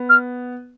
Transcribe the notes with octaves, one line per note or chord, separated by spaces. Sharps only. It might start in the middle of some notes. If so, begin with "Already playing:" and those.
Already playing: B3
F6